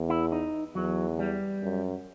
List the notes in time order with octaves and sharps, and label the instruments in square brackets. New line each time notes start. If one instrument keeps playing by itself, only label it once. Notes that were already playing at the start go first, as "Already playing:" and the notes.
Already playing: [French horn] E2
[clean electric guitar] E4
D#4
[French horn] E2 [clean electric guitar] F#3
[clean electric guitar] G3
[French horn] F#2